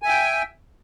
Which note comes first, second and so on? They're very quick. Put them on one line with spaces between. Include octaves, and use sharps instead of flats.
G#5 E5 G5